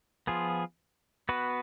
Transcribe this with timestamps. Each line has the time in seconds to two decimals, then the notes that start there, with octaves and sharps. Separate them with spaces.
0.27 F3 B3 F4 G#4
1.29 B3 F#4 B4